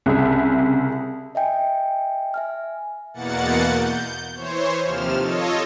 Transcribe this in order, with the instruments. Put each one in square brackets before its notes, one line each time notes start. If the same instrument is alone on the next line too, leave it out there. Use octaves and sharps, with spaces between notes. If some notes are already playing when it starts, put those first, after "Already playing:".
[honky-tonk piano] C2 C#3 E5
[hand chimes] D#5 E5 G5 G#5
E5 G#5 F6
[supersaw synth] E2 B2 A#3 F#5 A6 C#7
G6
E3 C5 C#5
D#2 C3 F3 F6 E7
F4 A4 C#5 D#5